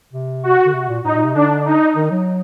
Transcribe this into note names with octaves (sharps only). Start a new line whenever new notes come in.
C3
F#4
D3
C3
A#2
A2 D#4
A#2
C3
D3 D4
D#4
D#3
F#3